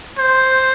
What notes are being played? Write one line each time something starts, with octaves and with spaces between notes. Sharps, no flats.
C5